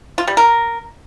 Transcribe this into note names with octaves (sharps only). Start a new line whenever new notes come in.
F4
G3
A#4